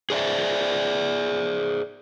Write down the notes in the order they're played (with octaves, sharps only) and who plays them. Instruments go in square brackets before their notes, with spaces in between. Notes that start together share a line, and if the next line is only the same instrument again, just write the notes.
[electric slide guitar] G#4 C5 D5 E5